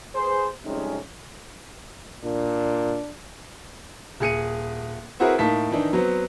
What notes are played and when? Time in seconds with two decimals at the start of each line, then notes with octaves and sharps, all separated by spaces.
0.15 G#4 B4 C5
0.64 F2 C3 G3 G#3 C#4 D#4
2.24 A#2 D4
4.20 D#1 G#4 C#7 D#7
5.20 C4 E4 F#4 G#4 A#4 B4
5.38 A2 A#3 D#4 A5 B6
5.70 D#3 E3 D4 D#4
5.93 F#3 B3 C4